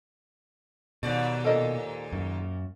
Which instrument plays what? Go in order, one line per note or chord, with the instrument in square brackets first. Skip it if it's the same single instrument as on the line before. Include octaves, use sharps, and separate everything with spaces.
[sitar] D#2 G#2 D5 [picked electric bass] B2
[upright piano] A#2 A#4 [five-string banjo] A4 D#5
[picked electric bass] F#2